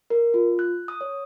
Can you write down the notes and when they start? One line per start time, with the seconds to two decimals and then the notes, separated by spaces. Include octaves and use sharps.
0.10 A#4
0.34 F4
0.59 F#6
0.88 D#6
1.01 C#5